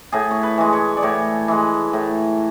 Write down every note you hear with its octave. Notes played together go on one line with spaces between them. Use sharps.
A2 G#4
C#5
B4
E3 G#3
C#5
D5
A2 C#5
E3 G#3
A2